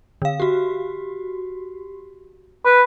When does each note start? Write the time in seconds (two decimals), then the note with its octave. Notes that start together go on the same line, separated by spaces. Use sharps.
0.22 D3 F5
0.40 F#4 G4
2.66 B4